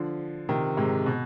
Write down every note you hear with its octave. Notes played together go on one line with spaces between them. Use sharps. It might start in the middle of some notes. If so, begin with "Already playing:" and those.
Already playing: D3 F3
C3 D#3
G#2 C3
B2